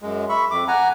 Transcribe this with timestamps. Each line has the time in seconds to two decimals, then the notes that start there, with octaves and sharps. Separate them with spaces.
0.02 F#2 G#3
0.29 E5 B5 C#6
0.51 F2 D6
0.68 F#5 G#5 A#5